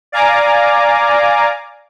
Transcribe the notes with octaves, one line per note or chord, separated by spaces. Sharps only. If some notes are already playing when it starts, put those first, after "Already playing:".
D5 F5 G#5 A#5 D6